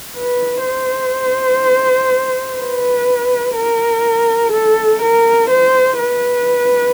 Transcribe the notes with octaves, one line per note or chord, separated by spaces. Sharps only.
B4
C5
B4
A#4
A4
A#4
C5
B4